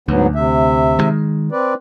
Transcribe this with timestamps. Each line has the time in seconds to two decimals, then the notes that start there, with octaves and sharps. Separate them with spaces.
0.08 D2 G#2 F#3 B3
0.35 C3 E5
0.99 D#3 G#3
1.52 C4 B4 D5